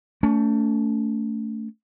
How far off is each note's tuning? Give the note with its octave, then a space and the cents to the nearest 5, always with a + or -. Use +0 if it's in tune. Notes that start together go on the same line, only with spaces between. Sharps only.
A3 +15 C#4 +40